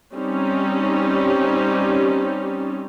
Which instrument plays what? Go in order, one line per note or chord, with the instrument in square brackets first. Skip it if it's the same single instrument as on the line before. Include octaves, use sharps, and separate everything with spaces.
[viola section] G3 C4 C#4 D#4 G4